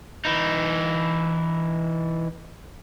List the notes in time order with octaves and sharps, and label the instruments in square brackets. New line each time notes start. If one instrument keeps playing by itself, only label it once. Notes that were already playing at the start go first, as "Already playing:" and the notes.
[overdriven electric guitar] E3 D#4